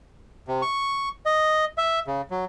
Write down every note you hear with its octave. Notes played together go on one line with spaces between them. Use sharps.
C3
C#6
D#5
E5
C#3
F#3